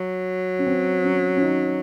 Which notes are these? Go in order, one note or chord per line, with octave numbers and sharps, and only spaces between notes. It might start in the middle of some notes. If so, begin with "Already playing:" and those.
Already playing: F#3
C#4
C4
C#4
C#4
D#4